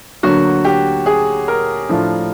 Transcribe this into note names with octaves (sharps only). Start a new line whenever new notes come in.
D2 D3 F#3 A#3 F#4
G4
G#4
A#4
A2 F3 A3 D4 F4